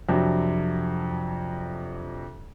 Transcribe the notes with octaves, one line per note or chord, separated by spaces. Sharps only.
F2 C3 F#3 D4